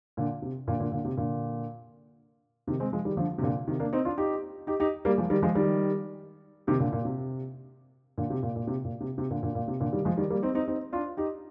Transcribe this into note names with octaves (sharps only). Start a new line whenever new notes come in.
A#2 D3
C3
A#2 D3
A#2 D3
A#2 D3
C3
A#2 D3
C3 D#3
G#3 C4
F3 G#3
D#3 G3
D3 F3
C3
A#2 D3
C3 D#3
A#3 D4
C4 D#4
D4 F4
D#4 G4
D#4 G4
D#4 G4
G3 A#3
F3 G#3
D#3 G3
F3 G#3
D#3 G3
C3 D#3
A#2 D3
A#2
C3
A#2 D3
C3
A#2
A#2
C3
A#2
C3
C3
A#2 D3
A#2 D3
A#2
C3
A#2 D3
D#3 G3
F3 G#3
D#3 G3
G3 A#3
C4 D#4
C4 D#4
C4 D#4
D4 F4
D#4 G4